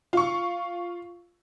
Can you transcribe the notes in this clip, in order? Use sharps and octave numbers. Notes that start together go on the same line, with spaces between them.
F4 C#6